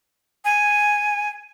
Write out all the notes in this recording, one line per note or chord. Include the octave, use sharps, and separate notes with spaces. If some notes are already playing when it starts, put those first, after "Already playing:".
G#5